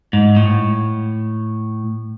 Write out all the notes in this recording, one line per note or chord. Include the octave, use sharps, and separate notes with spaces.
G#2
A2